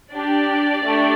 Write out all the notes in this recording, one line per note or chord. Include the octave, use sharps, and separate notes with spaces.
D4 G4 D5
A3 D4 G4